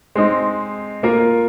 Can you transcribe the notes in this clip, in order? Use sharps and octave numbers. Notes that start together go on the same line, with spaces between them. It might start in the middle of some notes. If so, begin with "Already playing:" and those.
G#3 C4 D#4
A#3 F4 A#4